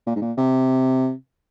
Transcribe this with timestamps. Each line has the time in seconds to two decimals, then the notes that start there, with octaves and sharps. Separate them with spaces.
0.07 A#2
0.16 G#2
0.22 A#2
0.38 C3